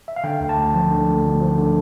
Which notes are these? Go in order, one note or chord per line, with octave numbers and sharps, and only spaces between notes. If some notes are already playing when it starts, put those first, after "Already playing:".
E5
F5
D3 G5
D2
A5
D2
F3
D3
D2
D2
F3
D3